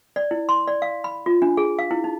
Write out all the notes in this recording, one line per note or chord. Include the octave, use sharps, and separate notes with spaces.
D5
E4
C6
D5
F5
B5
F4
D4
G#4
F5
E4
D#4